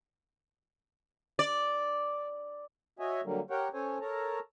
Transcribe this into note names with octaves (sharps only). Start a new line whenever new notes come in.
D5
F#4 C#5 D#5 E5 G#5
D3 F#3 G3 A#3
G4 A#4 C#5 F#5 G5
C#4 A4 C5 C#5 G#5
A4 A#4 C#5 A5 A#5